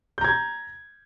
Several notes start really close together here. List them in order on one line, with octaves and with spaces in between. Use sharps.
G6 A#5 G#6